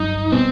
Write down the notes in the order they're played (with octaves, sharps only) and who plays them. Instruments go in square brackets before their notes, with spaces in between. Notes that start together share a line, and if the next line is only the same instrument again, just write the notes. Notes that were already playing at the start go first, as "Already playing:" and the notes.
Already playing: [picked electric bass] G2 F#3 [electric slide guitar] D#4
[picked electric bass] B2 G3 B3 [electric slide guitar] C4